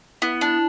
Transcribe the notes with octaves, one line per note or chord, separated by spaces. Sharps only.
B3 E4
D4